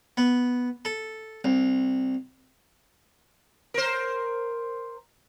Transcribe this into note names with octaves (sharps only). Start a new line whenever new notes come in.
B3
A4
C2
A#4 C5